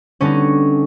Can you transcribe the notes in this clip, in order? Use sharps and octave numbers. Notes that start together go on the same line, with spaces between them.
D3 G3 B3 C#4 D#4 C#5